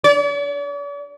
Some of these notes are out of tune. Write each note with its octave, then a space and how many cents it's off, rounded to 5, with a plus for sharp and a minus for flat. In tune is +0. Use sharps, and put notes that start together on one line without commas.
D5 -45